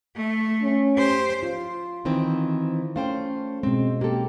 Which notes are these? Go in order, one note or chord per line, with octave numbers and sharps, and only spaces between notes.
A3
C#4
G4 C5
F4
D#3 E3 C4
A3 C#4 C5 F5 G5
B2 G#3 C4
A#3 G4 A4